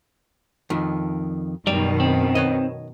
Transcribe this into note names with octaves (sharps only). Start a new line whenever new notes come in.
F2 D#3
F#2 B2 D#3 F#3 G3 D5
C4
B4 C#5 D#5